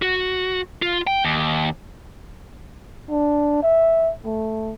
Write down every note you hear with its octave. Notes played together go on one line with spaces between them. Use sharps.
F#4
F4
G5
D#2
D4
E5
A3